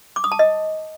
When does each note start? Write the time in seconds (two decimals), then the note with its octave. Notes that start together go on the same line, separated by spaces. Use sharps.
0.16 D6
0.24 D#6
0.32 A5
0.39 D#5